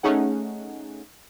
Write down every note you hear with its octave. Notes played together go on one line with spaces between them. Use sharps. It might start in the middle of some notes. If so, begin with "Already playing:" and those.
A3 C#4 D#4 G#4 F#5